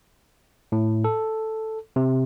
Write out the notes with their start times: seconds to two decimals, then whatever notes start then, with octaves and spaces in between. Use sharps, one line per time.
0.72 A2
1.04 A4
1.96 C3